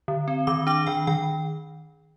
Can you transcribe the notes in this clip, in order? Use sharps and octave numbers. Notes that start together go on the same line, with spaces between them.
D3
C4
D#3 D6
D4 D6
D#3 G5
D#3 G5